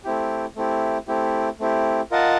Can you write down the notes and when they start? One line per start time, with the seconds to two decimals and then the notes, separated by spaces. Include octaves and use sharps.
0.04 A3 C4 E4 G4
0.56 A3 C4 E4 G4
1.08 A3 C4 E4 G4
1.60 A3 C4 E4 G4
2.11 F4 A#4 D#5 F#5 A5